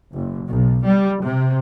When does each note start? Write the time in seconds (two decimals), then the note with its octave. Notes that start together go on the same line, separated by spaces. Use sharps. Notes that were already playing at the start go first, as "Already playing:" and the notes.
0.14 F#1
0.49 B1
0.86 G3
1.23 C3